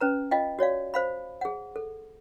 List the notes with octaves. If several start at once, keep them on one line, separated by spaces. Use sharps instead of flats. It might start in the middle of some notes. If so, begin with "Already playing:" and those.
C#4 B4 A#5
F4 D#5 F5 G5
F#4 C#5 D5 F5
C5 F5 B5
G#4 F#5
A4